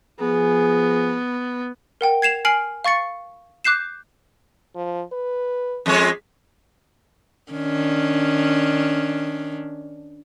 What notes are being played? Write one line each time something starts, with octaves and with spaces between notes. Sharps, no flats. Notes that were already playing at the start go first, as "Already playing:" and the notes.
F3 B3 G#4
A#4 F#5 G5
G#6 C7 E7 F7
G#5 F6 C7 D7 F#7
F5 C#6 A6 C#7
D6 F#6 G6 C7 E7
F3
B4
F2 G#3 C#5
D#3 C#4 D4